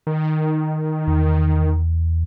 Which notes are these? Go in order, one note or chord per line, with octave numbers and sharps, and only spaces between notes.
D#3
E2